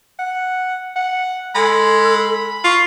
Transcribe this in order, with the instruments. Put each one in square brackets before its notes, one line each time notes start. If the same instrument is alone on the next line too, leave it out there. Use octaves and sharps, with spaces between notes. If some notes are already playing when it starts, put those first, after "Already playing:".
[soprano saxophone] F#5
F#5
[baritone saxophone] G#3 [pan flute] A4 [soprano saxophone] B5
[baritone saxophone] F4 [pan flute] C#6